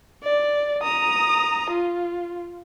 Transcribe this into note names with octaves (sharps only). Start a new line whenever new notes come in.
D5
A#5 D#6
F4